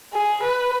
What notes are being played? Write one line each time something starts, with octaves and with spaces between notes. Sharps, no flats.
G#4
B4